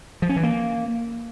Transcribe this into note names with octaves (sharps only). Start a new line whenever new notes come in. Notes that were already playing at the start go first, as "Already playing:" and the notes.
F3
C#4
E3
A#3